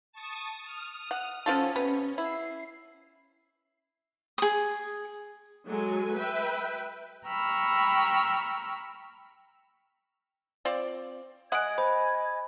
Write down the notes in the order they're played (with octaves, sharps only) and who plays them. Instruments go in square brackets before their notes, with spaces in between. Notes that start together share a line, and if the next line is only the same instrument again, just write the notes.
[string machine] A5 C#6 D#6
D#6 F6
[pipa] F#5
[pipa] F3 F4 A4 [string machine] C#4
[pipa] C3 B3
[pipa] E4 [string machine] C7
[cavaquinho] G#4 D#6
[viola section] F#3 G#3 A4 G#5
B4 E5 G5
[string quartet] G5 A#5 B5 C#6 E6 F6
[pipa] C4 F4 D5
[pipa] G#3 F#5 [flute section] D#5 G#5 G#6 [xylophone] D#6 F#6 D7
[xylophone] C5 [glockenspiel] B5